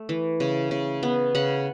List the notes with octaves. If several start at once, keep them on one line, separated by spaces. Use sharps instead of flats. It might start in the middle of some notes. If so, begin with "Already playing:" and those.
Already playing: A3
E3
C#3
C#3
B3
C#3 F#5 B5